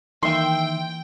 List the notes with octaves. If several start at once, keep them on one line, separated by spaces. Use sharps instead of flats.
D#3 E3 A#3 E5 G5 C6 D#7